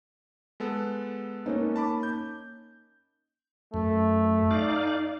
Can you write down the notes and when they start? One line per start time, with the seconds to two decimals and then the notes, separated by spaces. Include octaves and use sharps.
0.60 G#3 B3 A4
1.46 A#3 C#4 D#4
1.76 A5 B5 D6
2.03 G6
3.74 F#2 A3
4.51 D#4 D5 F5